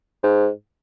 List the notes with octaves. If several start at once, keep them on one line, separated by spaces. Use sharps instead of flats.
G#2